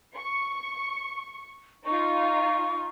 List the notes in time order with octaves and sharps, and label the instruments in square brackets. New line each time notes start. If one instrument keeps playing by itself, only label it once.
[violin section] C#6
[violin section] D#4 F4 [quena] C#6